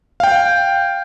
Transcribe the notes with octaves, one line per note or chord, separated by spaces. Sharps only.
F5 G5